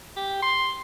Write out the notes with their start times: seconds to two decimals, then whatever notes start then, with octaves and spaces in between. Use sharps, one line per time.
0.17 G4
0.42 C6